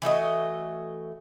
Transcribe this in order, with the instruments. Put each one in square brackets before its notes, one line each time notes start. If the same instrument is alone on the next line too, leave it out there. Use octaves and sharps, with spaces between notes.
[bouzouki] E3 A3 F#4 D#5